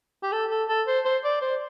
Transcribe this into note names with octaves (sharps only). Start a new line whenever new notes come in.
G4
A4
A4
A4
C5
C5
D5
C5